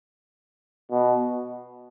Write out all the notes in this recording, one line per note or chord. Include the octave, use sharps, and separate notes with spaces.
B2